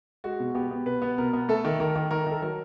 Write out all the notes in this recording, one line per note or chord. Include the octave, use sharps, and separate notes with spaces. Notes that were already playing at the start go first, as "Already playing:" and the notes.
G#3 F#4
B2
B3 G4
B3
B2 B4
B3
B2 A#4
B3
A3 A4
D#3
D#3 A#4
D#3
D#3 A#4
D#3 A4
F#3 A#4